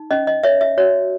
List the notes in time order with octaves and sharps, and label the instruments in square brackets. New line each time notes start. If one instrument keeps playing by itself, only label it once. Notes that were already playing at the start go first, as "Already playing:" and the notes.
Already playing: [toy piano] D#4
C#4 D#5
D#5
C#5 E5
E5
F#4 C#5